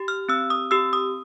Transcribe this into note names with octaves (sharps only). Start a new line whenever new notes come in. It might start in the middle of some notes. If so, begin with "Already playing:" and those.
Already playing: G4
F6
C4 E6
D#6
G4 E6
D#6